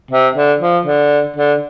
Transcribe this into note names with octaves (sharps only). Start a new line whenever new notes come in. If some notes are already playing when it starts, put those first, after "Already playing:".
C3
D3
F3
D3
D3